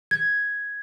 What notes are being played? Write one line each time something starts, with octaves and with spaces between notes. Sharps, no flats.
G#6